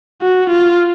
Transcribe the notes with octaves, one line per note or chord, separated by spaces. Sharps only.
F#4
F4